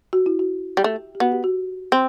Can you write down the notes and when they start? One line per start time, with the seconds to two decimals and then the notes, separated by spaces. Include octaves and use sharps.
0.13 F#4
0.26 E4
0.39 F#4
0.77 G3
0.84 A3
1.15 G4
1.20 B3 F#4
1.32 G4
1.44 F#4
1.92 C4